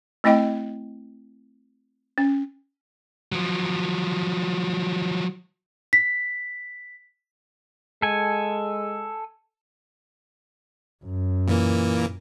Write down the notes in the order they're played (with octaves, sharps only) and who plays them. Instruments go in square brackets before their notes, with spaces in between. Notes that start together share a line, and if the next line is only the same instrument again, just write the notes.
[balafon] A3 C4 E4 D#5 G5
C#4
[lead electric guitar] F3 F#3
[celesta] B6
[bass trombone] G#3 [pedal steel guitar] A4 G#5
[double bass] F#2
[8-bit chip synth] A#2 E3 A#3